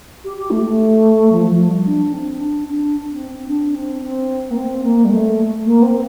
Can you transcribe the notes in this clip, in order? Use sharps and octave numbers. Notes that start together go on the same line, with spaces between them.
G4
G4
A3
A3
F3
F3
G3
D4
C4
D4
D4
C4
C4
D4
C4
C4
A#3
C4
A#3
G3
A3
A#3
C4